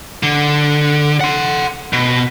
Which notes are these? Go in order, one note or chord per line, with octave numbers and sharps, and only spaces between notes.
D3
F#5 C6
B2